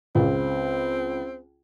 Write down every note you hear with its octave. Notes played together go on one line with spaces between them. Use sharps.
C#2 C4